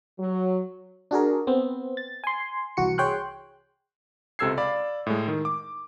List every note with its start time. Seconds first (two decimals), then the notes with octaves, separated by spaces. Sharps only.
0.19 F#3
1.11 D4 F#4 G#4 A#4
1.47 B3 C4
1.97 A6
2.24 G#5 C6
2.77 C2 E3 F#4 C#7
2.98 G#4 C#5 G5 C6 F#6
4.39 C#2 C3 A4 E6 G#6 C7
4.58 D5 F5 B5
5.06 A2 G#3
5.28 D#3
5.45 D6